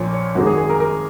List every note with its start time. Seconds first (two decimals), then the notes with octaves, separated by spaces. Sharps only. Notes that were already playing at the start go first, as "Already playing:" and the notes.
Already playing: A#1 A#2 F3 C#5
0.13 C#5
0.35 G#1 F#2 D#3 G#3 F#4
0.46 G#4
0.58 G#4
0.70 A#4
0.80 A#4